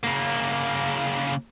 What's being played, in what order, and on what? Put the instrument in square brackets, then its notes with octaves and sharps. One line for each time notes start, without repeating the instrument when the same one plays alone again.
[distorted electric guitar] C#3 A#3